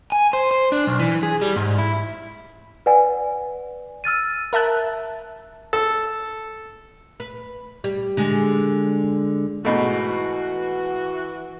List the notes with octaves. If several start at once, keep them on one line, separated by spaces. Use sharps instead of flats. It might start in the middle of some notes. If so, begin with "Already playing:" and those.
G#5
C5
C5
D4
B1
E3
G#4
G3
G#2
E4
B4 D5 F#5 G#5
E6 F6 A6 D#7
A#4 E5 A5 F#6
A4
B4
G3
D3 G#3
G#2 B2 E3 A3 F#4